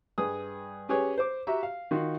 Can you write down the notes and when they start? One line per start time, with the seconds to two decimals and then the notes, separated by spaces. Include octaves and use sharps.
0.18 G2 G#4 B4 D#6
0.89 C#4 G4 G#4 B4 C#5
1.18 C5 D6
1.47 F#4 G4 E5 A#5
1.63 F5
1.91 D#3 F4 F#4